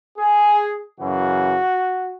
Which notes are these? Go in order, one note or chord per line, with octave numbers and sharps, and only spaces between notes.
G#4
F#2 C#3 E3 F#4